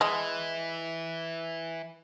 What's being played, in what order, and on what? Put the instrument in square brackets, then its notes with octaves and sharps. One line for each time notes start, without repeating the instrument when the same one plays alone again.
[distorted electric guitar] E3 [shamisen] G#3